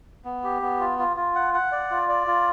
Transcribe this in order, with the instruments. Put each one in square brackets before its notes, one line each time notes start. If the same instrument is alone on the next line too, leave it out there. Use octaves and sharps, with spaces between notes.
[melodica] B3
G4
B3
F4
F4
F4
F#5
F#5
D5
F4
D5
F4